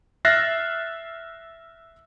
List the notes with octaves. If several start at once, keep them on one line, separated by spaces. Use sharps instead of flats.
E5 F6 F#6 A6 A#6 C7